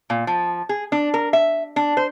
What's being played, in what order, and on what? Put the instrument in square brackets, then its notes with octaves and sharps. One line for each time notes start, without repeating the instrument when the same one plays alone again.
[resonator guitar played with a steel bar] A#2
F3
G#4
D4
A#4
E5
D4
C5